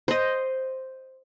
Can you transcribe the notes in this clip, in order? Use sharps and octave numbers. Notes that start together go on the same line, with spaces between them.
C5 D#5